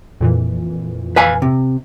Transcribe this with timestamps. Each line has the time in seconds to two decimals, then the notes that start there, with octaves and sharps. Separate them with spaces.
0.21 F2 A#2 E3
1.16 B4 F5 G#5
1.42 C3